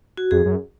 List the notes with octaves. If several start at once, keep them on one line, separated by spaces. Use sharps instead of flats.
F#4
F2 G#4
F#2